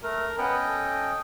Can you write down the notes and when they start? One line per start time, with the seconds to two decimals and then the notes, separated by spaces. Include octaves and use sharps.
0.03 A3 A#4
0.38 B3 C#4 D#5 G5
0.67 A4